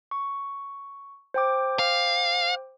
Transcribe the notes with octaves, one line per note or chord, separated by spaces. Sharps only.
C#6
C5 G5 D6
F5